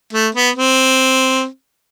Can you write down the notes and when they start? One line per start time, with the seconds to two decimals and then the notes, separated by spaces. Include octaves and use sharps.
0.13 A3
0.35 B3
0.56 C4